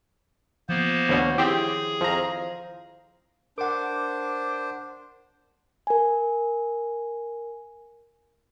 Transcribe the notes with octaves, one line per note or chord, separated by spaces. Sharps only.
F3 A#3 B3 C5
D2 B2 D#3 C#5 F#5
C4 E4 G4 G#4
F2 C5 F5 A#5
D4 A#4 C5 F#5 D6
A#4 G#5